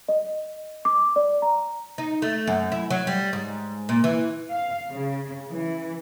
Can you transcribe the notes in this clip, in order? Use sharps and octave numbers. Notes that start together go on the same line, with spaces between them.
D#5
D6
D5
A#5
D#4
A3
F#2
E4
F#3
G3
G#2
A#2
E3
F5
C#3
E3